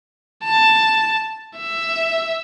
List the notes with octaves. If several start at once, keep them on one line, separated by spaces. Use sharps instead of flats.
A5
E5